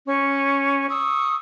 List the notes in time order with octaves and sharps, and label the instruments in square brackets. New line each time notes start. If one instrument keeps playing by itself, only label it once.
[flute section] C#4 C#6
C#6 D#6 E6